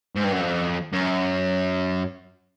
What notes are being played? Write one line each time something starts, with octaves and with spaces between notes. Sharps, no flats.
G#2
G2
F#2
F2
F#2